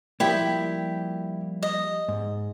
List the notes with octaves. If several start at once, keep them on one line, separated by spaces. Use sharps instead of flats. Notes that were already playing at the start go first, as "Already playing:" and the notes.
F3 G3 A#3 E4 G4 G5
D#5
G#2